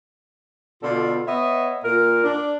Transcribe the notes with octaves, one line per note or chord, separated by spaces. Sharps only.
B2 D3 F4 A4 D5
B3 C#5 D#5 E5
A#2 A#4
D4